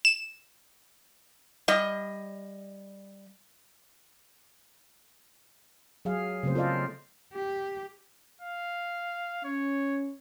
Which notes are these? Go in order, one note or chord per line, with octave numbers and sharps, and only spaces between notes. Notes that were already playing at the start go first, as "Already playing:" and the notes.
E7
G3 D#5
F#3 G#4 F5
C#3 F#3 A3 A#3 C4 C5
F4 A4 C5 D5 D#5 F5
G4
F5
C#4 C#5